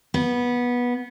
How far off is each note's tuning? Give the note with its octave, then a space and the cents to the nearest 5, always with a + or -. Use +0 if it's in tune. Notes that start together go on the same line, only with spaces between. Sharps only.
B3 -15